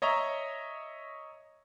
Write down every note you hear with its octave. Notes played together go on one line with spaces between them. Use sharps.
C#5 D#5 E5 A#5 C#6